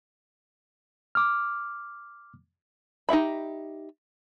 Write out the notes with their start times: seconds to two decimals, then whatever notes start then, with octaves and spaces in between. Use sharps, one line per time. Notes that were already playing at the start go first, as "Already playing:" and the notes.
1.15 D6 F6
3.09 D#4 G4 E5 B5